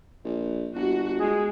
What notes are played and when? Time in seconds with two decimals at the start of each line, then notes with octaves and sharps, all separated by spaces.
0.25 A#1
0.75 G1 F#4
1.20 G#3 G#4